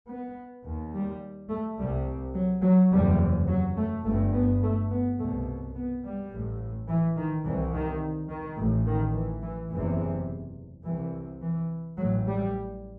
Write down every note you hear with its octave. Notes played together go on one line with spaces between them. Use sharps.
B3
D#2
G3
A3
C2 C3 G3
F#3
F#3
F#1 E2 C3 G3
F#3
A3
G1 G2 A3
B3
A3
B3
C2 B2 A3
B3
G3
A1 A2
E3
D#3
C2 C3 E3
D#3
D#3
A1 A2
D#3
E3
E3
F#1 E2 C3 E3
C2 C3 E3
E3
A1 A2 F#3
G3